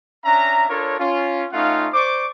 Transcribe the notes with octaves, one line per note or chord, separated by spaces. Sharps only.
C#4 D4 E5 A#5
D4 F4 A4 A#4 C#5
C#4 F4
A3 C#4 D#4 F4 F5 F#5
C5 D5 C#6 D6